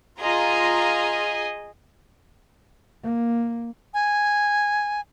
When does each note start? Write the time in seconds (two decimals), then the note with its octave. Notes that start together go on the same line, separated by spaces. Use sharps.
0.21 F4 G#4 D#5 A#5
3.03 A#3
3.94 G#5